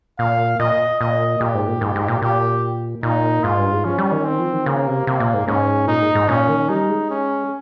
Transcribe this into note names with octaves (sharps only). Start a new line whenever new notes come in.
A#2 F5
A#2 D#5
A#2 D#5
A#2 G4
G#2
A#2
G#2
G#2
A#2
A#2 G4
A#2 D#4
G#2 F4
G2
G#2
F3 C#4
G3
D#3
C4
F3
D#3
C#3 A#3
C3
C3 A#3
A#2
G#2
G#2 C#4
A#2 D#4
G#2
G#2
A#2 C#4
D#3
G3 D#4
G#3
C#4